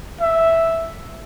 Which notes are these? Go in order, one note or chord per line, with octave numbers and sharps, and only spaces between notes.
E5